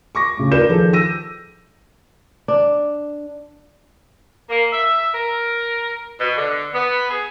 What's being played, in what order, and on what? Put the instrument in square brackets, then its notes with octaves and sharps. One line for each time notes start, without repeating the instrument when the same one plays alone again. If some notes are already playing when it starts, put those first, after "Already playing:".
[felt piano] C#6 D6 A#6
A2 C#3
A#4 B4 D5 G6 E7
D#3 F3 G#4 A4
E6 A#6 D#7
[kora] D4
[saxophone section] A#3
E5
A#4
B2
D3
B3
G#4